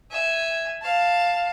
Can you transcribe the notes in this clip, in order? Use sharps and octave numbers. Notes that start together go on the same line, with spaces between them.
E5 G#5
F5 A5